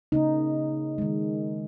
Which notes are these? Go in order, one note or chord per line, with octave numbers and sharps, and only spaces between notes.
C#3 A#3 D#4
D#3 G#3